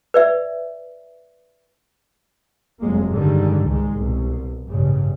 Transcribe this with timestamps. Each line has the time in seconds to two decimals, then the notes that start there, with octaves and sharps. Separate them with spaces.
0.14 B4 D5 E5
2.80 F1 F2 F#3 G#3 A#3
3.10 G2 D3 D#3 G3 G#3
3.67 C#2 G#2 G#3
3.95 C2 B2
4.67 A1 G2 C#3 G3